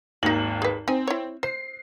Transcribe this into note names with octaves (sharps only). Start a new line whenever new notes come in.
G#1 D#2 D#4 F#4 F#7
G#4 B4
C4 D#4 G#5
E4 C#5
C5 C7